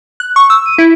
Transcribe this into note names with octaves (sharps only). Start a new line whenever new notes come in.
F#6
C#6
E6
D#7
E4